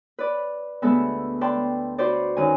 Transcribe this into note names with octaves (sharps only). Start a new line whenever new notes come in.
B4 D5
D2 G#3 B3 A4 E5
B4 D5 G5 A5 C6
F#4 B4 C5 D5
F#2 D#3 G#5